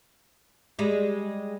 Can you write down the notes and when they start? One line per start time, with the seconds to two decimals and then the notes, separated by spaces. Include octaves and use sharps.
0.79 G3 G#3